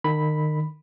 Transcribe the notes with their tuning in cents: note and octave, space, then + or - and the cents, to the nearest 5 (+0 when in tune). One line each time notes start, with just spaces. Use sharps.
D#3 -30 B5 +0